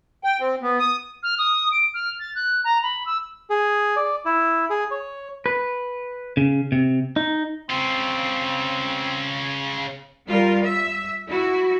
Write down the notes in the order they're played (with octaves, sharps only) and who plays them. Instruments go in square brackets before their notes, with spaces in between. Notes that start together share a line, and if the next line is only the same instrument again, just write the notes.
[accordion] G5
C4
B3
D#6
[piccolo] F6
D#6
D7
F6
A6
F#6
A#5
B5
E6
[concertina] G#4
D5
E4
G#4
C#5
[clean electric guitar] B4
C#3
C3
D#4
[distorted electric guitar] C#3 F4 [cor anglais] C4
[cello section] G3 F4 A#4
E5
E4 F#4